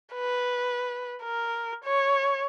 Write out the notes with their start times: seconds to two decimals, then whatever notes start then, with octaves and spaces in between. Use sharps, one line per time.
0.14 B4
1.23 A#4
1.84 C#5